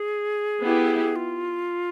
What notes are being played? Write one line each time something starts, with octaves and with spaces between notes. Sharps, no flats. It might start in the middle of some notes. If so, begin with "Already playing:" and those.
Already playing: G#4
B3 E4 G4
F4